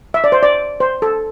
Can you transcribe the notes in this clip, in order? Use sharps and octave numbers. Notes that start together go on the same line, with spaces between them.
E5
D5
C5
D5
C5
A4